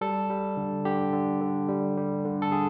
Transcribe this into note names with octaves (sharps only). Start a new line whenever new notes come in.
G3 A4
G3
D3
D3 G4
D3
D3
G3
G3
D3
A4
D3 G#4